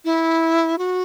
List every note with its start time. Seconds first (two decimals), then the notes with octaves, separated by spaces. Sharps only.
0.05 E4
0.78 F#4